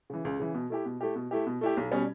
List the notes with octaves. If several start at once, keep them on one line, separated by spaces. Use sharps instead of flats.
C#3 E3
C#2
C#3 E3
B2
A3 E4 G4
B2
A3 E4 G4
B2
A3 E4 G4
B2
A3 E4 G4
B1
B2 G3 C#4